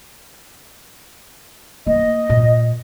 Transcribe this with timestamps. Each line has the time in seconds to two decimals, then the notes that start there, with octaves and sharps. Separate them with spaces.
1.87 A#3 D#5
2.29 A#2